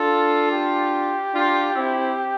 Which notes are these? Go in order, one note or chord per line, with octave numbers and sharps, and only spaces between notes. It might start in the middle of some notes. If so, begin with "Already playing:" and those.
Already playing: D4 F4 A4
G4
D4 F4
C4 E4